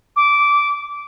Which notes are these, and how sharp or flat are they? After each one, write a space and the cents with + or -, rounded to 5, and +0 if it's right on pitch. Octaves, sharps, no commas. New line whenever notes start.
D6 -15